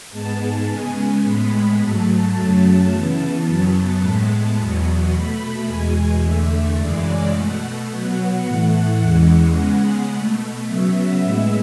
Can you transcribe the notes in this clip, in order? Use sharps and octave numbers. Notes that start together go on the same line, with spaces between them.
G#2 G#3 B3 A5
C#3 G#3 B3 G#5
A2 G#3 B3 B5
G#2 F#3 A3 A5
F#2 C#3 F#3 A3 A5
C#3 E3 B3 A5
F#2 C#3 F#3 B3
A2 G#3 B3
E2 B2 F#3 B3
B2 A3 B5
E2 B2 G#3 G#5
E2 D3 A3 E5
F#2 C#3 E3 G#3 D5
B2 A3 F#5
B2 F#3 B3 F#5
A2 E3 A3
E2 C#3 E3 G#3 F#5
C#3 G#3 B3
B2 A3
C#3 F#3 B3 E5
A2 G#3 B3